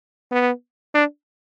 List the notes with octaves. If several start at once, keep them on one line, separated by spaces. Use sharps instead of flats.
B3
D4